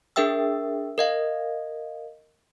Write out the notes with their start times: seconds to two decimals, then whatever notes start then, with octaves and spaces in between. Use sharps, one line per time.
0.16 D4 G#4 A#4 E5 G5 E6
0.98 A#4 D#5 F5